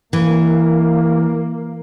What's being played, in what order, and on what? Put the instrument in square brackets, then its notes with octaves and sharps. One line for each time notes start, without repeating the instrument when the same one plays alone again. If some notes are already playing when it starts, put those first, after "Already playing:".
[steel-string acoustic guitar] E3 [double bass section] A#3